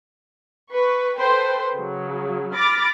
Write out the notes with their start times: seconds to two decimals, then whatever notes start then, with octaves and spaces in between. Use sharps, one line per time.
0.71 B4 C#6
1.19 A4 B4 C5 G5
1.75 C#3 F#3
2.55 B5 D6 F6 A6 A#6